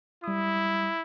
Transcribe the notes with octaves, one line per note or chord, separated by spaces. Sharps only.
G3 E4 D#6